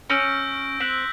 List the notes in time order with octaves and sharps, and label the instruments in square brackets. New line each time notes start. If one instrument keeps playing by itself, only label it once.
[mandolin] C#4 [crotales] E6 G6 A#6 D7
[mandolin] C4 [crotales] F#6 B6 D7 F#7